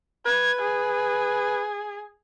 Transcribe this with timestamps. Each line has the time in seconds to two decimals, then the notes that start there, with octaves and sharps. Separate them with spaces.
0.26 B4 G#6
0.61 G#4